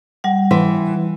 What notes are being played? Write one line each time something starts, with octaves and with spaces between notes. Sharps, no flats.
G3 F#5
E3 C6